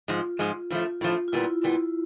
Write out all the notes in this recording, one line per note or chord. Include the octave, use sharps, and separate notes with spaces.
G#2 F3 G#3 F4
G#2 F3 G#3
A2 F3 A3 F4
A2 F3 A3
F4
A#2 G3 B3 E4
A#2 G3 B3 E4